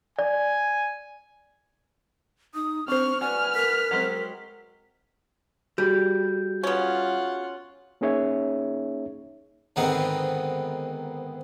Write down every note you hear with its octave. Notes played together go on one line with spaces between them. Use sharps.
D5 G#5
D#4 D#6
C4 D4 C5 C#6 F6
F#4 B4 D5 G#5 F6
A#4 B6
F#3 G#3 C4
G3 F#4 G#4 G6
B3 C#4 F4 F#5
A#3 C#4 D#4 G#4 C#5 E5
D2 G#2 D#3 B3 C4